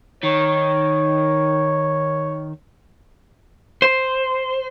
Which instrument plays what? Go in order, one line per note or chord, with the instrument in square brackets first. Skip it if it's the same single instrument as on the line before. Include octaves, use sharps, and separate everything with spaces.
[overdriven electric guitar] D#3 [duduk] C#5
[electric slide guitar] C5